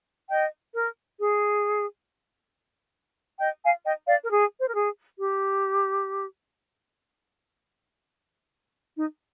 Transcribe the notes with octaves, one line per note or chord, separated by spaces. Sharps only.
D#5 G5
A#4
G#4
D#5 G5
F5 G#5
D#5 G5
D5 F5
A#4
G#4
C5
A#4
G#4
G4
D#4